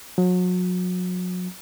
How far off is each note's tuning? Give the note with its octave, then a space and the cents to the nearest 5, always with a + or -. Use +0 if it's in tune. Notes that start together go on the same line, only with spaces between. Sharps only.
F#3 -35